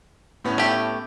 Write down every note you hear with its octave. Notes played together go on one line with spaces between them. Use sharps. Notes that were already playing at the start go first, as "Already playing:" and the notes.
A2 B3 C#4
A3 G4